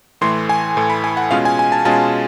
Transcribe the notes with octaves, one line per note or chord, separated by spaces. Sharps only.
A2 E3 A3 C6
G#5
A2 E3 A3
B5
G#5
F#5
B2 G#3 C#4 F4 F5
G#5
G#5
A5
B2 G#3 C#4 F4 A5